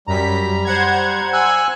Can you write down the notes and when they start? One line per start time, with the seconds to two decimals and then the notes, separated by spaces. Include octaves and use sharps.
0.07 F#2 G3 A#5 B6
0.65 C5 F#5 G#6
1.33 G#5 E6 F#6